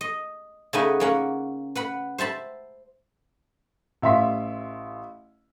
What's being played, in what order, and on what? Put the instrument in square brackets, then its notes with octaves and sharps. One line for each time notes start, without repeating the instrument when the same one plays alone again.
[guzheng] D#5
C#3 A3 D#4 B4 F#5 G#5
A#3 C#4 F#5
B4 F#5 B5
C5 E5 A5 B5
[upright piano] A1 E5 F5 C6 B6